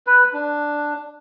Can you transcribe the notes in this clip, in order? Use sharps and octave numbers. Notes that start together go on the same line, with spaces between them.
B4
D4